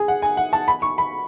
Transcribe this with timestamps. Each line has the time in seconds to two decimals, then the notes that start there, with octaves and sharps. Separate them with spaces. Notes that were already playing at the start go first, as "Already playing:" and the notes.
Already playing: G#4
0.08 F#5
0.22 G#5
0.37 F#5
0.53 A5
0.68 B5
0.82 C#6
0.98 B5